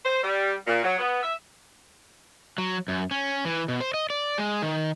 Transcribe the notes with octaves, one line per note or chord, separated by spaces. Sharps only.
C5
G3
A#2
F#3
B3
E5
F#3
F#2
C#4
E3
B2
C5
D#5
D5
G#3
D#3